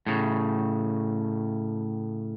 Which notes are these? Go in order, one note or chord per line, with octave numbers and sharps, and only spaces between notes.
A2 C#3